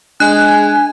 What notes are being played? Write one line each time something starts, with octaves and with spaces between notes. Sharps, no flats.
G#3 D4 G#5 F#6